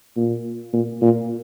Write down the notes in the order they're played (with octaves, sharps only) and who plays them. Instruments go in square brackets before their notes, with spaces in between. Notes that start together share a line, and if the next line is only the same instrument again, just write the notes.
[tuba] A#2
A#2
A#2